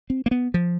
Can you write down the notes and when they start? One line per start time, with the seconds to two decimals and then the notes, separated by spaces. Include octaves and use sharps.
0.10 C4
0.26 A#3
0.31 B3
0.54 F3